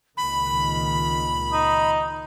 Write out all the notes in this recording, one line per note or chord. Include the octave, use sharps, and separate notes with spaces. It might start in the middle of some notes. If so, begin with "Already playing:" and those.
C#2 A#2 D#3 B5
D#4